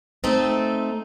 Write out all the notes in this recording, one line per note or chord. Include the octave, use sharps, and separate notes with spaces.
A3 C4 D#4